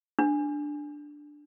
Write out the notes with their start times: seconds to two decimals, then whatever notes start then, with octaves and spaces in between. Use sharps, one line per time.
0.19 D4